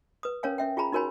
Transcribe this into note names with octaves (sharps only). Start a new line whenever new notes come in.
B4 D#6
C#4 A#4 C#5 F5 G#5
C#4 E5 G5
F4 G#4 G#5 A#5 B5
D#4 F#4 A#4 C#5 G#5 B5